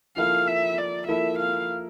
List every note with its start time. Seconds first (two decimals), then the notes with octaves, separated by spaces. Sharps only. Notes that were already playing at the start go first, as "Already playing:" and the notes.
0.17 F3 A#3 E4 A4 F5
0.48 E5
0.78 D5
1.08 F3 A#3 E4 A4 E5
1.39 F5